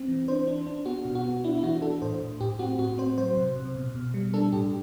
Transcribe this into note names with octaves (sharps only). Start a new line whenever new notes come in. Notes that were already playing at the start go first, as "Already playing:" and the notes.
Already playing: C4
E3
D4 C5
D4
D4
B3 F#4
B2
F#4
B3
D4 E4
E4
E3 F#4
D4 A4
A2 C5
A2
A2 G4
C4 F#4
A2 F#4
C4 C5
F#3 C5
C3
C3
B2
B2
G3
D4 A4
A2 G4